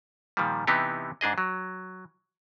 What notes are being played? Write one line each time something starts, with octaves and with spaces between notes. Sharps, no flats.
A#2 D#3 F3 G3
C3 E3 B3 D#4 G4
G#2 D4 G#4 D#5
F#3